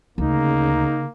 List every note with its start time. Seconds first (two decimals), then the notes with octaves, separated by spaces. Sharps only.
0.18 D2 C#3 A#3 D#4